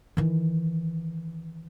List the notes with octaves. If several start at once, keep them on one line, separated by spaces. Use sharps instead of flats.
D#3 E3